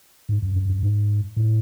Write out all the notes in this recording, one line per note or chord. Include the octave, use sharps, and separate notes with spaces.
G#2
F#2
F#2
F#2
G#2
A2